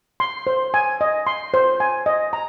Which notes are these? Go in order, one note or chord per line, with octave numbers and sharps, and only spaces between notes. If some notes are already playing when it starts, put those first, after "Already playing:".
C6
C5
G#5
D#5
C6
C5
G#5
D#5
A#5